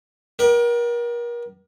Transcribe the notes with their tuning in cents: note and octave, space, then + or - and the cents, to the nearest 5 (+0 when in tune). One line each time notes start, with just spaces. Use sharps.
A#4 +35 D5 +35 G5 -40